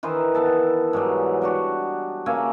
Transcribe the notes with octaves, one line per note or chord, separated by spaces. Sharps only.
D#3 E3 B4 C5
B3 A4 A5
G#2 E3 F#3 G3
G3 D4 F#4
C#3 A#3 E5 G#5